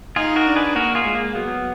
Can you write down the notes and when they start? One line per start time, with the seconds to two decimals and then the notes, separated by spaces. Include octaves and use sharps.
0.16 D#4 F4 G#4
0.36 F#4 A#4
0.46 D4
0.56 G#4 B4
0.75 A#3 F#4 A#4
0.95 F4 G#4
1.05 G#3
1.15 A#3
1.35 F#3 B3